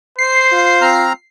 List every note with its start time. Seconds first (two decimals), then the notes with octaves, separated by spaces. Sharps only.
0.19 C5 C7
0.53 F4
0.82 C4 A#5 F6